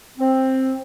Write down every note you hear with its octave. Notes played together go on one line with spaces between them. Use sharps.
C4